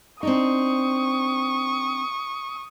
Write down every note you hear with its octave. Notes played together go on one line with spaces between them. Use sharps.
C4 D4 D#4 C#6 D#6